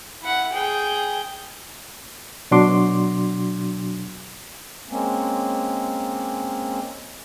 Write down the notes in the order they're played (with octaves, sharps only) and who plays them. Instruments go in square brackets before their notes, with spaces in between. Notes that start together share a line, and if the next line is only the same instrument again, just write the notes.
[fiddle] E4 F#5
G#4 G5
[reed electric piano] B2 F#3 D4 F#4 C6 D6
[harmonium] G#3 A#3 C4 C#4